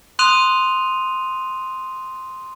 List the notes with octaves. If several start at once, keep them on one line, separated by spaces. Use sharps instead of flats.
C6 D#6 F#6 D#7 F7